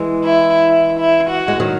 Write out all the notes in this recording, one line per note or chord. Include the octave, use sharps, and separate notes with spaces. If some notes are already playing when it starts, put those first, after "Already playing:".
Already playing: E3 G#3
E4
E4
E4
F#4
G#3
D#3 F#3